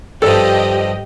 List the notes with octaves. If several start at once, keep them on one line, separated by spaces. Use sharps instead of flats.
G2 F3 G4 A4 D#5